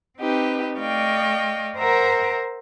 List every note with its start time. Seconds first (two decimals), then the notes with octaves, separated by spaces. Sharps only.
0.18 C4 D#4 G4 B4
0.78 A3 D5 D#5 F5 G5 C#6
1.78 A#4 C5 E5 F#5 A#5